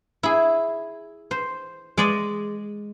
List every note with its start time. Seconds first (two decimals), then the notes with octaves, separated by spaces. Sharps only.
0.23 E4 G#4
1.31 C5
1.97 G#3 D5 D#5